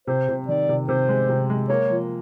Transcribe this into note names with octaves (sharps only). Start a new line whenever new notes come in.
C3 C5
C3
D#3 D5
C3
C3 C5
G#3
C3
G#3
A#3 C#5
F3